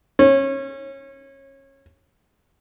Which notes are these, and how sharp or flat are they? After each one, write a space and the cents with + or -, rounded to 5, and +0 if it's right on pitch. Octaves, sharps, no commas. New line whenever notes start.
C#4 -25